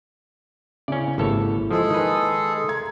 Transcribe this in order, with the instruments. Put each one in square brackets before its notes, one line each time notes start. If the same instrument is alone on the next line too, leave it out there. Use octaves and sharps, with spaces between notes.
[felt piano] C#3 E4 [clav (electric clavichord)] C#4 D5
[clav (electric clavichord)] G#1 A4 C#5 [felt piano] A#3 E4 G4
[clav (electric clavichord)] F3 [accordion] G#3 G#4 A4
[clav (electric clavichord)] D#3 B4
[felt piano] A#5 C6 G#6